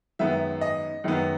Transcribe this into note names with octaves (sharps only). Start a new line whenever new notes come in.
F#2 D#3 G#3 B3 E5
D#5
F#2 D#3 G#3 B3